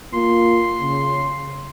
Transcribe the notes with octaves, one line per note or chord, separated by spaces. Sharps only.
A#3 F4 C6
C#3